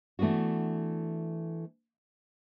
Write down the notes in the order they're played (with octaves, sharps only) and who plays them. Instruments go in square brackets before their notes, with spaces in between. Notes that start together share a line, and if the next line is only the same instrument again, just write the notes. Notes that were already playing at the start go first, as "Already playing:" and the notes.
[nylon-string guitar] E3 A3 B3 D4 F#4